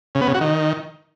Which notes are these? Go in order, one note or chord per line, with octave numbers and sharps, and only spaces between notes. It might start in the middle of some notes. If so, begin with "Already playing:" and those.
C#3
B3
C#3
F#4
D#3